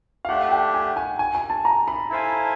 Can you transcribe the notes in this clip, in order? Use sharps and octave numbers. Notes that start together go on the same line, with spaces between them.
F5
A3 D4 G4 F#5
G5
G#5
G#5
G#5
G#5
A5
A#5
B5
E4 A4 C5 F5 G#5